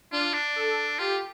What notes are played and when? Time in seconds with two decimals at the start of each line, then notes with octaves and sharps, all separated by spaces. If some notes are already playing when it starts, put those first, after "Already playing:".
0.12 D4 F4
0.34 D4
0.56 A4
0.99 F4 G4